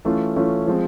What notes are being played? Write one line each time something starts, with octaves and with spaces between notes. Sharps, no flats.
E3 A3 C#4 F4
E3 A3 C#4 F4
F3 G#3 C4